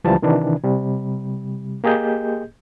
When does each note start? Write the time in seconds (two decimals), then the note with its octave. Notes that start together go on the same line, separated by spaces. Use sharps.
0.04 C#2 E3 F3 G3 A5
0.22 C3 D#3 E3 D4
0.64 C3 G3
1.84 A#3 G4 G#4 D#5 G6